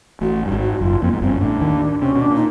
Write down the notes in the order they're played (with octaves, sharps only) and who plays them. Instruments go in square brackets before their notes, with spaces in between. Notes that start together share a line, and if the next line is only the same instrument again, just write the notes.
[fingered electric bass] A1 A2 [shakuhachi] F#4
[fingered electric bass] G2
G#1 G#2
[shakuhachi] F#4
F#4
[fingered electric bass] F#1 F#2 [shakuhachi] F4
[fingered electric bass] F2 [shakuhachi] A#3
[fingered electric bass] G#2 [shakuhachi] B3
[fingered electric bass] G1 G2 [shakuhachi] C4
[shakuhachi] C#4
[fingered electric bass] A1 A2 [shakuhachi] D4
[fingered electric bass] D#2 D#3
[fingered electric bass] C3 [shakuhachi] C#4
[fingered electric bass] B2
[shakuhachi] D4
[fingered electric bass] A#2
[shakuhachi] D#4